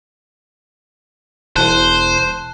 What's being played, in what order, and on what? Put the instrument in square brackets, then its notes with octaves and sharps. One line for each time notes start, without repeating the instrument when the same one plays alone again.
[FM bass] E1 [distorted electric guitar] C5 [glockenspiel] A5 F#6